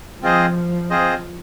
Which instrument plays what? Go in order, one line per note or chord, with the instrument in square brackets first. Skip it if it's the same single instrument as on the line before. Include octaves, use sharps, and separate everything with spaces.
[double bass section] F3 [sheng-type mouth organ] C4 F4 G#4 C5 D#5
[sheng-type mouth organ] C4 F4 G#4 C5 D#5